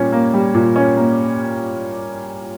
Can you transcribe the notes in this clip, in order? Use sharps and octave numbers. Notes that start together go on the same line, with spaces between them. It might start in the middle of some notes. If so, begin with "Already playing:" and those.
Already playing: A#2 G3 C#4
A#3
G3
A#2
C#4
A#3